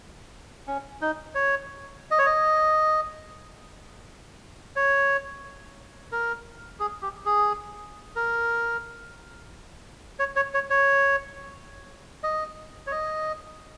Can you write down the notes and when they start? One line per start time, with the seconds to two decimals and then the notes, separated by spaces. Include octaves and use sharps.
0.67 C#4
1.01 D#4
1.35 C#5
2.11 D#5
2.19 C#5
2.26 D#5
4.76 C#5
6.12 A#4
6.80 G#4
7.02 G4
7.25 G#4
8.16 A#4
10.19 C#5
10.36 C#5
10.54 C#5
10.70 C#5
12.23 D#5
12.87 C#5
12.92 D#5